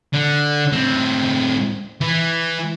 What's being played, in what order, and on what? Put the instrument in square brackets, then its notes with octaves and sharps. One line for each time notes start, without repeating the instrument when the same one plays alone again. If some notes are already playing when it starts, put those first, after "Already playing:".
[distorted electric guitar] D3
A2 C4
E3